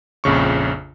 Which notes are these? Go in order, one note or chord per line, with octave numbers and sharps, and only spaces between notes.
A#1 F2 C#3 C#6